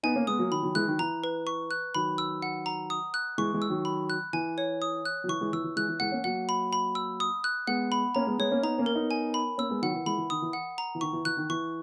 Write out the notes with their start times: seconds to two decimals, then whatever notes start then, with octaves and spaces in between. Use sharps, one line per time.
0.03 B3 D#4 G#5
0.16 A#3 C#4
0.27 G#3 B3 D#6
0.39 F#3 A#3
0.51 D#3 F#3 B5
0.63 D#3 F#3
0.75 E3 G#3 F#6
0.88 D#3 F#3
0.99 E3 A#5
1.24 B4
1.47 C#6
1.71 F#6
1.95 D#3 F#3 B5
2.18 E6
2.42 F#5
2.66 A#5
2.90 D#6
3.14 F#6
3.38 E3 G#3 C#6
3.54 E3 G#3
3.62 E6
3.70 D#3 F#3
3.85 B5
4.10 F#6
4.33 E3 G#5
4.58 C#5
4.82 D#6
5.05 F#6
5.24 F#3
5.28 E3 C#6
5.41 E3 G#3
5.53 E3 E6
5.64 E3
5.76 E3 G#3 F#6
5.89 E3
6.00 E3 G#3 F#5
6.12 A#3 C#4
6.24 F#3 A#3 F#5
6.49 B5
6.73 B5
6.95 E6
7.20 D#6
7.44 F#6
7.67 G#3 B3 F#5
7.92 B5
8.15 A#3 C#4 A#5
8.27 G#3 B3
8.39 G#3 B3 C#5
8.51 A#3 C#4
8.63 B3 D#4 A#5
8.78 A#3 C#4
8.86 A#4
8.95 B3 D#4
9.11 G#5
9.34 B5
9.58 A#3 C#4 E6
9.70 G#3 B3
9.82 D#3 F#3 F#5
9.94 E3
10.06 E3 G#3 B5
10.17 E3
10.30 D#3 D#6
10.42 E3
10.53 F#5
10.78 A#5
10.95 E3
11.01 D#3 C#6
11.13 E3
11.25 E3 F#6
11.37 D#3
11.49 E3 C#6